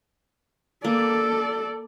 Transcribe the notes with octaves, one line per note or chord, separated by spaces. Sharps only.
A#3 A4 D5